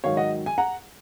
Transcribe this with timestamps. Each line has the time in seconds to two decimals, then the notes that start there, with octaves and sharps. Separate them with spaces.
0.04 G#2 D#3 F#3 C#5 F5
0.17 D#5 F#5
0.46 G#5
0.58 F#5 A#5